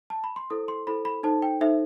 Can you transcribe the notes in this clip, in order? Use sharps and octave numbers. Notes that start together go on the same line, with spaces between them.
A5
B5
C6
E4 A4 C5 D#6
C6
E4 A4 C5 B5
B5
D#4 A4 C5 A5
G5
D#4 A4 C5 E5